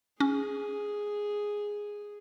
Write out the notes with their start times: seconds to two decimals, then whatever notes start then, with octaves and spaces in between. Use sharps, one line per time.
0.20 C#4 G#4